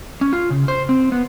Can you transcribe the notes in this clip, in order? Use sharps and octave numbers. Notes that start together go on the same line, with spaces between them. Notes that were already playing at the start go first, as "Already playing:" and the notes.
C#4
F4
C#3
C5
C4
B3